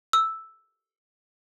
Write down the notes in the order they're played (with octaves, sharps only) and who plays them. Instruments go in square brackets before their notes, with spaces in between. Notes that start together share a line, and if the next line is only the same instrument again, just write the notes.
[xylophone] E6